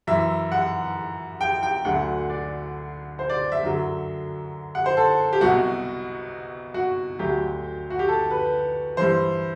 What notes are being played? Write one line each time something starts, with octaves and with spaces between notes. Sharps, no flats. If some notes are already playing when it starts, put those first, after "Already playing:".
F#2 E3 E5
F#5
G5
G5
D2 D3 F#3 F#5
D5
C5
D5
E5
F#2 D3 F#3
F#5
C5
A4
G4
C2 B2 F#3 F#4
F#4
D2 D3 F#3 G4
F#4
G4
A4
B4
G2 E3 C5